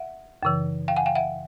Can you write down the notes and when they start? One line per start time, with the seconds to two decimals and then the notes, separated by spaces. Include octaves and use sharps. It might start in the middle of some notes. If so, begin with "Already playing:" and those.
Already playing: E5 F#5
0.43 F#2 C#3 E3
0.88 F5 G5
0.96 F#5 G#5
1.06 F5 G5
1.15 E5 F#5